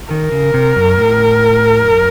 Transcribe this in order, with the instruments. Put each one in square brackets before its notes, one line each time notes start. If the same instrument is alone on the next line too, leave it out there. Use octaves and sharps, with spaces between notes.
[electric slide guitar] D#3 [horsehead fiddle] A#4
[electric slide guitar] C#3
C3
F#2
A2
F#2